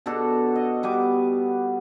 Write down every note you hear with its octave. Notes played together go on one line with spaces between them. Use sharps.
B2 D4 F#4 A4
D#5
G3 B3 G#5 D6